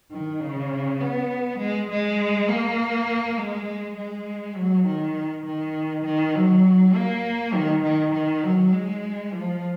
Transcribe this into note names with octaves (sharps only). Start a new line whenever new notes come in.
D#3
C#3
B3
G#3
G#3
A#3
G#3
G#3
F#3
D#3
D#3
D#3
F#3
A#3
D#3
D#3
D#3
F#3
G#3
F3